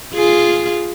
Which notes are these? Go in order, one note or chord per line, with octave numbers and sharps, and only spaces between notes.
F4 G#4